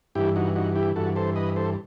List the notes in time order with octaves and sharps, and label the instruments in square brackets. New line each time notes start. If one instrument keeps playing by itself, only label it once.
[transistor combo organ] G2 E3 E4 G4
D#4 F#4
D#4 F#4
E4 G4
G2 E3 F#4 A4
A4 C5
B4 D#5
A4 C5